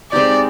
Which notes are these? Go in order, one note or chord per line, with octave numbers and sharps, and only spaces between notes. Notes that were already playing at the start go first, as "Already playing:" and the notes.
G#3 C4 D#4 G4 D5